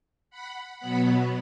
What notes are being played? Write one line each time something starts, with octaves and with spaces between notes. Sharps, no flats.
F#5 B5
B2 F#3 B3 F#5 B5